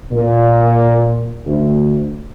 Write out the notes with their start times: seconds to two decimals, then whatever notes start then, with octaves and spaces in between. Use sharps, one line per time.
0.12 A#2
1.46 D2